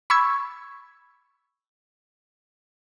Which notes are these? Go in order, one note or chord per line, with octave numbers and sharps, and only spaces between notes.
B5 C#6 E6 G#6